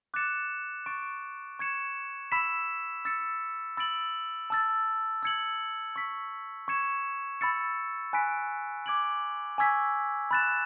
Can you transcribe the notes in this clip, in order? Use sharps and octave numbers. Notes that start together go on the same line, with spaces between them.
D6 F#6 A6 C#7 E7
C#6 F#6 A6 D7
C#6 G#6 C#7 E7
B5 E6 B6 E7
E6 A6 C#7
B5 E6 A6 D7 F#7
A5 E6 A6
E6 G#6 C#7 F#7
C#6 E6 B6
C#6 G#6 C#7 E7
B5 E6 A6 C#7
G#5 B5 F#6 B6 D7
D6 G#6 D7 F#7
G#5 C#6 E6 G#6 B6
B5 F#6 A6 E7